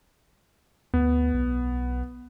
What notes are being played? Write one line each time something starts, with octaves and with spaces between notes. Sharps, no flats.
D2 B3
B1